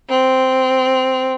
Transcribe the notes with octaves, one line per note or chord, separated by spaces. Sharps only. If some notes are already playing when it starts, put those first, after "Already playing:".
C4